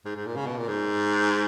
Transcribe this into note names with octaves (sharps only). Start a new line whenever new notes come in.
G#2
G#2
A#2
C#3
B2
A#2
G#2